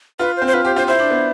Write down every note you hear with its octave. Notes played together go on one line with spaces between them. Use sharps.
F4 B4
C5
C4
C5
F4 B4
G4 C5
F4 C5
E4 C5
D4
B3